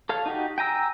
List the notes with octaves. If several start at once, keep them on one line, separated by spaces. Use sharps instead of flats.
A4 C#5 F5
D#4 F#4 G4
G5 G#5 A#5 E6